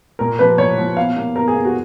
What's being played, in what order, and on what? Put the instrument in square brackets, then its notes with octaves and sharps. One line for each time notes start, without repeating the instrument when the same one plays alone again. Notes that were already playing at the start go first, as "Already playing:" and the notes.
[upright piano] A#2 A#4
F3 A#3 B4
A#2 C#5
F3 A#3
B2 F5
A#3
B2 A#4
G#4
A#3
F#4